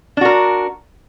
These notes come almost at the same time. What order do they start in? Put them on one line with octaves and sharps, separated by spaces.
D4 F#4 A#4